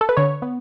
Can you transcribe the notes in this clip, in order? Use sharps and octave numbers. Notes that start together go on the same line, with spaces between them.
A4
B4
D3 C#5
B3